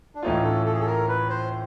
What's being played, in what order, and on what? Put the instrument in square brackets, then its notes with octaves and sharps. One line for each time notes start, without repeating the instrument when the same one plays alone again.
[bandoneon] D4
[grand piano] A2 E3 A3 C#4 F4 [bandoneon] D#4
[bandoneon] A4
A4
G#4
A4
A#4
B4
C5